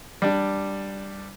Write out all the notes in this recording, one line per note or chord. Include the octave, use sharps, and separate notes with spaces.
G3 D4